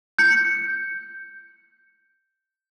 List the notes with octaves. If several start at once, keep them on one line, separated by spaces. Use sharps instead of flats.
G6 C#7